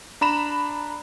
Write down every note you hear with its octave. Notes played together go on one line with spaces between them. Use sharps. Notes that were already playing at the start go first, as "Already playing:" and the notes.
D4 A#5 B5 E7